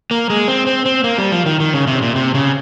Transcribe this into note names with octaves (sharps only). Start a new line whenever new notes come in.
A#3
G#3
C4
C4
C4
A#3
G3
F3
D#3
D#3
C#3
C3
A#2
C3
C#3